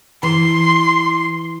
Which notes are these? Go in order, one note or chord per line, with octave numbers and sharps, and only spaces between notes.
E3 C6